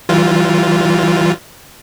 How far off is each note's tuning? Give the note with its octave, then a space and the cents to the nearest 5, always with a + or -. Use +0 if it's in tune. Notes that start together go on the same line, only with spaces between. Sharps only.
E3 -5 G3 -40 F4 +0